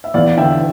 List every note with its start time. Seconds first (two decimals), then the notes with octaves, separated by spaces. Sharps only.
0.04 E5
0.14 E2 D5 F5
0.37 D3 E5 G5